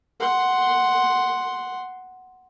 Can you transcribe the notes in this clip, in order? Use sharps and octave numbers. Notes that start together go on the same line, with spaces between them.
F#5 C6